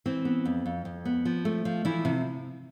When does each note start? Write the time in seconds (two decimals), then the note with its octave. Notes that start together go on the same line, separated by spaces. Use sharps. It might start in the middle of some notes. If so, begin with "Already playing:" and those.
0.06 E3 C4
0.25 B3
0.45 F2
0.66 F2
0.85 F2
1.05 B3
1.25 F3
1.45 A3
1.65 F3
1.85 E3 F3 E4
2.05 C3